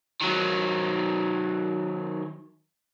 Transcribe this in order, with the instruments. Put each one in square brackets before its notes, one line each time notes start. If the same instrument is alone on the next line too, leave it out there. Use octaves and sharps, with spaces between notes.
[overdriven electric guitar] D#3 F#3